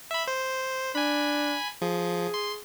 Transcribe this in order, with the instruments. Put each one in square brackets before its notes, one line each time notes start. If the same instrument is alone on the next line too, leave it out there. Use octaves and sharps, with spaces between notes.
[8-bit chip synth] E5 B5
C5
[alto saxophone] D4 [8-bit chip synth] G#5 B5
[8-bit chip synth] F3 [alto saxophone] G#4
[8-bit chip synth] C6